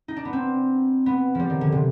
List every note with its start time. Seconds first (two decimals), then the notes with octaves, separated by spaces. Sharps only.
0.08 D#4
0.16 D4
0.25 B3
0.33 C4
1.06 B3
1.35 F3 G3
1.50 D#3
1.61 D3
1.72 C3